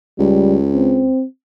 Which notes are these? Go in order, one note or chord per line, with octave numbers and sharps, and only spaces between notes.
C#2 G3
C4